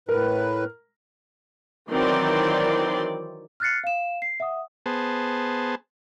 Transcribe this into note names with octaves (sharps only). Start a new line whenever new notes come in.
A2 A#4 B4
D#3 E3 F#3 C4 D5 C6
F6 F#6 A6 C7 C#7
F5 E7
C7
E5 F#5 D#6
B3 G#4 C5 A5